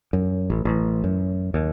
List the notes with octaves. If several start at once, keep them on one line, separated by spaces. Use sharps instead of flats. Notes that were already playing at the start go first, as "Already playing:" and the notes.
F#2
A1
A1
F#2
D#2